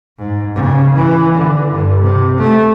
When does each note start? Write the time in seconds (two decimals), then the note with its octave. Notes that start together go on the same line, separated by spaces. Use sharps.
0.18 G#2
0.55 C#3
0.95 E3
1.34 D3
1.71 G2
2.02 C3
2.39 A3